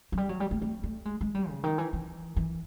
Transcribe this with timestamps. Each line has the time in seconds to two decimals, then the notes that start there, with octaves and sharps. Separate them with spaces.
0.12 F#3
0.17 G3
0.29 F#3
0.40 G3
0.51 A3
0.62 A3
0.83 A3
1.05 G#3
1.21 G#3
1.35 G3
1.49 C#3
1.64 D#3
1.78 E3
1.93 E3
2.36 E3